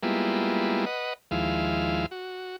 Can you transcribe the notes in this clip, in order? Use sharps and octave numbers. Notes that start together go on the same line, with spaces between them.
G3 G#3 A#3 B3 E4 F4
B4 D#5 F#5
D#2 F3 G#3 E4 F5
F#4